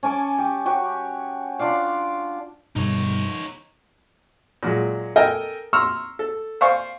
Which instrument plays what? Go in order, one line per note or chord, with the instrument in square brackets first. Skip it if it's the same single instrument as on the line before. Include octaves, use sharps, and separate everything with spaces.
[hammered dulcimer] C#4 G#5 A5 D6
G4
F#4 G4 C#5
D4 F4 D5 F5
[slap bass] G2 B2 D3 [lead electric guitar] D#4 C#5
[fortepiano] A#2 F#3 G#3
A4 A#4 D#5 G5 G#5 A#5
A#5 C6 C#6 E6 F6
A4
C5 D5 F5 G#5 C#6